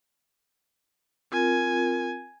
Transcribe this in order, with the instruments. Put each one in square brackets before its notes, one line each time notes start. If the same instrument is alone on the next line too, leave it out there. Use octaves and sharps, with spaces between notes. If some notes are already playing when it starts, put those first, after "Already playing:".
[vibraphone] C4 F4 A#4 [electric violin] G#5